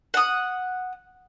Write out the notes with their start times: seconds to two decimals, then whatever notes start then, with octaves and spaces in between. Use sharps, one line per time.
0.14 F#5 D#6